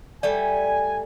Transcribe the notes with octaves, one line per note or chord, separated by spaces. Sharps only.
G3 A3 D5 G#5